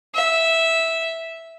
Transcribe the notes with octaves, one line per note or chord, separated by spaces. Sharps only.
E5